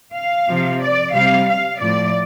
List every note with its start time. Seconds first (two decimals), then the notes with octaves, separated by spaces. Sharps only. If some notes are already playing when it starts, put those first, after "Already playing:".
0.15 F5
0.49 C3 F3
0.81 D5
1.14 C3 G3 F5
1.47 F5
1.80 A2 F3 D5